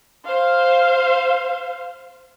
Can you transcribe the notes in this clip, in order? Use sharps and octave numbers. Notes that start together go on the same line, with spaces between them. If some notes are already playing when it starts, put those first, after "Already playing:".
C5 F5